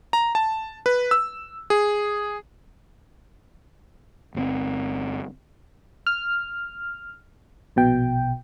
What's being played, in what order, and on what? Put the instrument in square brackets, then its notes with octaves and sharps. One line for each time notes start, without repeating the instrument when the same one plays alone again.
[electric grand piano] A#5
A5
B4
E6
G#4
[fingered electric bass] G1 B2 C4
[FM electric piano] F6
A#1 B2 G5